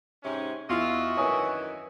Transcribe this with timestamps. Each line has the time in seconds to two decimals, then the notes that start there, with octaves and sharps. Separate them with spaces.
0.23 G#2 C3 C#4
0.69 E2 F4 F#4 D#5 E5
1.17 F#2 D#3 E3 C#5 G#5 D#6